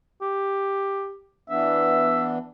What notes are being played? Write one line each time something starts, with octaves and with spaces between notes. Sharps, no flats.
G4
E3 B3 D4 E5